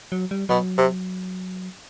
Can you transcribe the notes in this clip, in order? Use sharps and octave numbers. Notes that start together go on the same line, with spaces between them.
F#3
G3
B2 F#3
C3